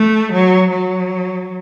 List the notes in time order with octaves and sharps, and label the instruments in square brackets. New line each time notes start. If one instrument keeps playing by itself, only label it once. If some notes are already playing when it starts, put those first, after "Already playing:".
Already playing: [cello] A3
F#3
F#3